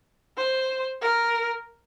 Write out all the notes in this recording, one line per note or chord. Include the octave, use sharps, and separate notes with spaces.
C5
A#4